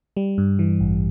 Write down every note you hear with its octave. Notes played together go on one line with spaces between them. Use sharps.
G3
G2
E3
A1